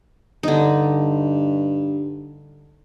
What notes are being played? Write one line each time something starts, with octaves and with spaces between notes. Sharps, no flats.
G2 D3 D#4